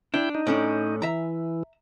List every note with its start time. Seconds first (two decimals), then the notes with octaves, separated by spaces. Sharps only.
0.14 D4 E4 G5
0.35 D#4
0.47 A2 C#4 D4
1.02 E3 E5 A#5